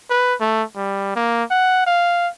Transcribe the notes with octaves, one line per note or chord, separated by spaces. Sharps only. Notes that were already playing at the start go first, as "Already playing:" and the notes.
B4
A3
G3
A#3
F#5
F5